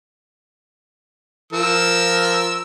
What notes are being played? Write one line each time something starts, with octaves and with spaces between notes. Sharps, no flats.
F3 A#4 E6